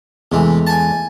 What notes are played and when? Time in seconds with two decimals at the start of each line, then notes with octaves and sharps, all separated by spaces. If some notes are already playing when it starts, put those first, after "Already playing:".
0.32 E2 C3 E3 G#3 A3
0.67 G#5 A5